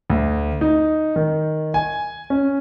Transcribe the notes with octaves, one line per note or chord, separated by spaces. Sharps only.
D2
D#4
D#3
G#5
C#4